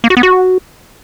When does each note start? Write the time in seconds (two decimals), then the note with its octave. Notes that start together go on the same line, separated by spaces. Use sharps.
0.04 A#3
0.10 F#4
0.17 B3
0.23 F#4